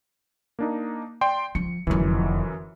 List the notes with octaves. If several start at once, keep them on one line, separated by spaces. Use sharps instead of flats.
A#3 D4 D#4
D5 G5 C6
F3 C#7
F1 F#2 D3 E3